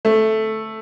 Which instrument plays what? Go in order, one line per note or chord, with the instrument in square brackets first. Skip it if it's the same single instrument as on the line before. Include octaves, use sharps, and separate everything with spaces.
[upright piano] A3